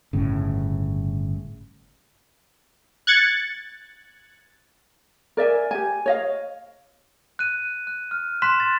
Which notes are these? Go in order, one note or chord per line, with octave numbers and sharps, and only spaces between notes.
G1 A2 C#3
F#6 G#6 A6 C#7
A#4 D5 E5 G#5
G4 G#5
C#5 D#5 F5
F#6 D#7
F#6
F6
C6 F#6 B6 E7
A6